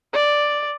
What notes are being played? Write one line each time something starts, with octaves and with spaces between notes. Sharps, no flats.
D5